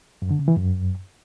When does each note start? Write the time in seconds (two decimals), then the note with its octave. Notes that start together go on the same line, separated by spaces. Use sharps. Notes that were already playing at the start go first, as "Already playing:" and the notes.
0.22 F#2
0.31 D3
0.39 C#3
0.48 E3
0.56 F#2